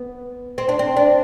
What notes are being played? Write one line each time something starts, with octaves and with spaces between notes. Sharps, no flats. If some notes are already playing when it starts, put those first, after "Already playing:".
Already playing: B3
C4
D4
C4
D4